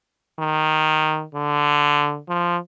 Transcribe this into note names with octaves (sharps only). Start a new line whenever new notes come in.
D#3
D3
F3